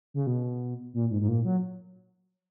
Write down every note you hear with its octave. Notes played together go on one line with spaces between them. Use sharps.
C#3
B2
A#2
G#2
G#2
A#2
F#3